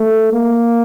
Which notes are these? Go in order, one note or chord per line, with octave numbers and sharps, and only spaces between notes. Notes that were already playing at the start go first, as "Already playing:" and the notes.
Already playing: A3
A#3